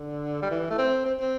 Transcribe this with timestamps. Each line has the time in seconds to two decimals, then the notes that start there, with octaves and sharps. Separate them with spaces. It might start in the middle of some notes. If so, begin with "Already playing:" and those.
Already playing: D3
0.42 G3
0.51 E3
0.70 A3
0.78 C4
1.05 C4
1.20 C4